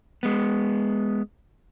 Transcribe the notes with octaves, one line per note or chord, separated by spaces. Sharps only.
G#3 B3